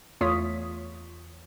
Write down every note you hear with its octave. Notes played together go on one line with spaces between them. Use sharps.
E2 A3 F4 C#5 D#6 B6